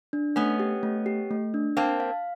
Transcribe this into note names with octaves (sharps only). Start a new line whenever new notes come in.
D4
A3 B3 C#4
G4
A3
G4
A3
D4
A#3 C4 A5
F5